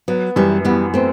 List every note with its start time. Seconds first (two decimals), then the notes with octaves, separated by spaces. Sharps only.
0.08 F#3 B3
0.36 F#2 E3 G3
0.65 E3 G3 B3
0.94 A3 B3 C4